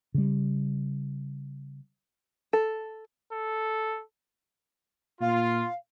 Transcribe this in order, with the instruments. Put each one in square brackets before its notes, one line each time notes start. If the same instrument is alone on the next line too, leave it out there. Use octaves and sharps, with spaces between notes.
[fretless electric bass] C#3 G3
[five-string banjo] A4
[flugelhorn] A4
[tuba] A#2 [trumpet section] F4 [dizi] F5